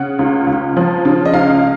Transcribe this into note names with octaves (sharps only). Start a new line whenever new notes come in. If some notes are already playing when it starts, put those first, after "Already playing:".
Already playing: C#3 F#5
C#2
C#2
F3
C#3
D#5
C#2 F5